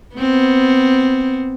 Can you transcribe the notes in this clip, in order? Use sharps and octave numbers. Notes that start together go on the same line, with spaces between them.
B3 C4